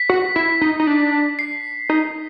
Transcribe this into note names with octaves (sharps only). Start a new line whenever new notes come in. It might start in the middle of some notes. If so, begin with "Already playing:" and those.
Already playing: B6
F#4
E4
D#4
D#4
D4
C7
D#4